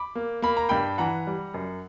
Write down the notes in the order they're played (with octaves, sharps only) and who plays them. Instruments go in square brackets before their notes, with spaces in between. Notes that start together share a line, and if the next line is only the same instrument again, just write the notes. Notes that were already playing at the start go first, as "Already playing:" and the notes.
Already playing: [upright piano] B5 D6
A#3
A#3 B5
A#5
G2 G5 B5
E3 F#5 A#5
G3
F#2